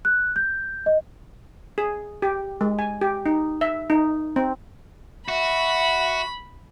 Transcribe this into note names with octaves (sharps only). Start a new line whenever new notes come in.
F#6
G6
D#5
G#4
G4
G#3
G#5
G4
D#4
E5
D#4
C4
F#4 E5 B5